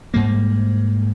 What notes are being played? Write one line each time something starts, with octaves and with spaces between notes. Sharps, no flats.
G#2 G3 A#3